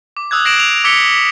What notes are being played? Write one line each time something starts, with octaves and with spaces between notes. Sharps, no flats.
D6
D#6 E6 F#6 G#6
G#6 A#6 C7 D7 E7 F#7
F7
D6 E6 G#6 B6 C#7 G7
B6